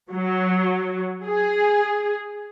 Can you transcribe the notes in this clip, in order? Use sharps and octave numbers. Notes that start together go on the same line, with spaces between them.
F#3
G#4